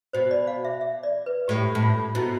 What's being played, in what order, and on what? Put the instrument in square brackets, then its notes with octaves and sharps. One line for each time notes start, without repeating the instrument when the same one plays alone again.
[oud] B2 [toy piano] C5
[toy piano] D5
F5
E5
E5
D5
B4
[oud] A2 [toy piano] G4
[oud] A2
[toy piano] F4
[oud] B2 [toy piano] E4